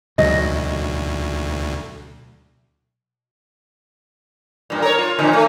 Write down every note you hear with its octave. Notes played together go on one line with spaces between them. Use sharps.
D2 B2 F#3 D#5
G2 A#2
A#4 C#5
F4
F2 A#2 D3
A3